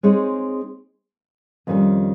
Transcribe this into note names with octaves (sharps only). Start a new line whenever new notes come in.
G#3 C4 D#4 G#4 C#5
F2 D#3 G3 C#4